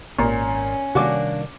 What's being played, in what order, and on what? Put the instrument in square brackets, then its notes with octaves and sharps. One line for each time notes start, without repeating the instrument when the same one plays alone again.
[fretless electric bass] G#1 [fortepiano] A#2 [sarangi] C#4
[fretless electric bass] C3 D#3 G3 [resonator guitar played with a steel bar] A#3 D4 [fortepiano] F#4 D6